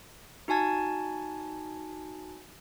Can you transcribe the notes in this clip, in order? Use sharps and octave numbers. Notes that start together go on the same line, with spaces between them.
D#4 F#4 G#5 A5 G#6